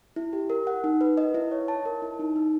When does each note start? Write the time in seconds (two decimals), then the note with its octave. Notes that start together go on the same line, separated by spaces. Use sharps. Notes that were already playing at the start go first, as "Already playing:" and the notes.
0.16 E4
0.33 G4
0.50 A#4
0.67 F#5
0.84 D#4
1.01 B4
1.17 D#5
1.34 E4
1.52 C#5
1.68 A5
1.85 A#4
2.02 E4
2.19 D#4
2.36 D#4